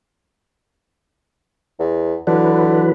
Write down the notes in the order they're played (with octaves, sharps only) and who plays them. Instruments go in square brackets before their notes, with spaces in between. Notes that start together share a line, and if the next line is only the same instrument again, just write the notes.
[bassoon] E2
[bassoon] D3 [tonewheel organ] E3 F#3 B4